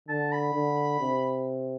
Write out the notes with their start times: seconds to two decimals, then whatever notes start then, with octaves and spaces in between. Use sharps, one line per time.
0.08 D3 A5
0.32 B5
0.54 D3
1.01 C3